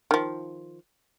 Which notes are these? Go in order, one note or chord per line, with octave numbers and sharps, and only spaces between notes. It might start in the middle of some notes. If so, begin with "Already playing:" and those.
D#3 F3